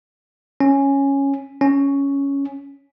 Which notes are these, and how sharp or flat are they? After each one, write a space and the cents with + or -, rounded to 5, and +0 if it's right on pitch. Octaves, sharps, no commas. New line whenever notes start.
C#4 -5
C#4 +5